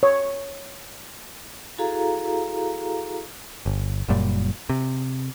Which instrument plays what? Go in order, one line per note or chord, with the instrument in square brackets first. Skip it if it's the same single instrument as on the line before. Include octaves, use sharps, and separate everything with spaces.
[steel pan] C#5
[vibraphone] E4 F#4 G#4 A4 F5 A#5
[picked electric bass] G1
F#1 F#2 A#2 G3
C3